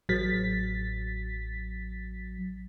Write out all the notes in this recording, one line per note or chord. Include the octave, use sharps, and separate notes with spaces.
A1 F#3 A6 B6